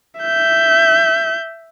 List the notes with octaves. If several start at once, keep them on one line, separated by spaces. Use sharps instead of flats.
E5 G6